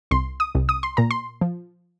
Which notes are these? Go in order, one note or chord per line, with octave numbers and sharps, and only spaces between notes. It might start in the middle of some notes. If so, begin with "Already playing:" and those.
C2 C6
D#6
C2
D#6
C6
A#2 A#5
C6
F3